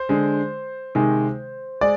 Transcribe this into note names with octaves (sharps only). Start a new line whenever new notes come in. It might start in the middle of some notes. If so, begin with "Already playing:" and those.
Already playing: C5
D3 G#3
C3 D#3 G#3
G#3 D5